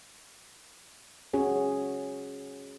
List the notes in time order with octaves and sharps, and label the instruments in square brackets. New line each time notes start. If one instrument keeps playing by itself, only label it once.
[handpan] C#4 F#4 G#4 C#5